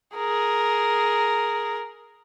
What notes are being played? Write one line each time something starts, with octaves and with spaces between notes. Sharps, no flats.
G#4 A#4